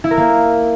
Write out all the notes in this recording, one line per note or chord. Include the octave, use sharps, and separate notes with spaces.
E4
A#4
A#3